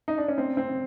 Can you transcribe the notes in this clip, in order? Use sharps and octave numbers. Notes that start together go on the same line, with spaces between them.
D#4
D4
C#4
C4
C4